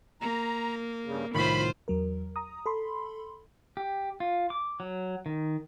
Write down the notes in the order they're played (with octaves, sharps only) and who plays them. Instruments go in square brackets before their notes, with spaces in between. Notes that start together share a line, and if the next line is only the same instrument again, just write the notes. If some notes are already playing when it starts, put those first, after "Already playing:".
[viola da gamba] A#3 [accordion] A#5
[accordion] G2 C#3
[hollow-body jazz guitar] C2 A2 D#3 [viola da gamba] F4 C5 [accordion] B5
[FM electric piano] E2 F#3 A#4
A#5 D#6
A4 B5 C6
[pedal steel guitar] G4
F4
D6
F#3
D#3